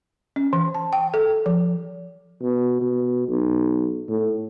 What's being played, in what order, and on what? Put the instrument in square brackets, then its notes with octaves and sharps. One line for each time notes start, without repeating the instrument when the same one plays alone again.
[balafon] C#4
E3
A5
G5
A4
F3
[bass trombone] B2
B2
B1
A2